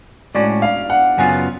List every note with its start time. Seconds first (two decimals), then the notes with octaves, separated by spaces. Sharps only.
0.35 A2 G#3 C#4 F#4 D5
0.62 F5
0.90 F#5
1.18 F#2 C#3 F#3 B3 F4 G#5